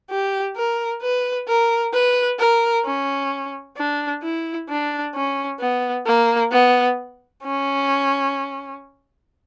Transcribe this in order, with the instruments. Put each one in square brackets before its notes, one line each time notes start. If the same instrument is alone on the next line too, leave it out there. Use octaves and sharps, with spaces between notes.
[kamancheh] G4
A#4
B4
A#4
B4
A#4
C#4
D4
E4
D4
C#4
B3
A#3
B3
C#4